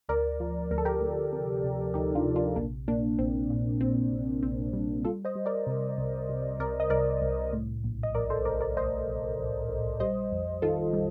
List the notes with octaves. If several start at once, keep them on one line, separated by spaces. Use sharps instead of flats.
D2 A#4 D5
F3
D2 A#4
A4
G4 A#4
D2
C3
C3
D2 D#4 G4
D4 F4
C3
D4 F4
A#1 A#3 D4
A#2 A#3 D4
A#1 C4
A#2
A#1 C4
A#1
A#1 C4
G3
G3 F4 A4
C5 D#5
G3
A#4 D5
C3
C2
C3
C2 A#4 D5
D#5
C2 A#4 D5
C2
A2
A#1
D#5
A#1 A#4 D5
A4 C5
A#1 A#4 D5
A#4 D5
A#1 C5 D#5
A#1
A#1
A#1
G3 C5 D#5
F2
D#3 F4 A4
G3